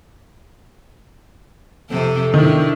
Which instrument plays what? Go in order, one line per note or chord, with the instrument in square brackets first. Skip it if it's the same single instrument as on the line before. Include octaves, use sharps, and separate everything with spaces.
[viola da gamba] F2 C3 A4
[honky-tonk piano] D#3 [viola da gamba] D4 E4